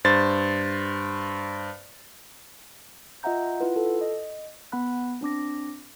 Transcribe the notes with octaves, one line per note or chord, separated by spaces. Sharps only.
G2 C5 A6
F4 D#5 E5 F#5 A#5 G6
E4 F4 B4 F#5
A4
D#5
B3 F#5 B5 F#6
C4 D4 D6 A#6